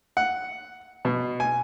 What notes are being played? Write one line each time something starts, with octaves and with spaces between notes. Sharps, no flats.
F#5
B2
G#5